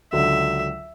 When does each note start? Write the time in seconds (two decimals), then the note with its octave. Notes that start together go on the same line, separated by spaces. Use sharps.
0.13 C#2 D3 F#3 E5